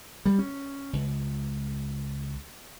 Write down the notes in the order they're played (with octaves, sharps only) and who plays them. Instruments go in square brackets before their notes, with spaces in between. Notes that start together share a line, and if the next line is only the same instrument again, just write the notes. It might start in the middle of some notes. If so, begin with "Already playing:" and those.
[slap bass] G3
C#4
C#2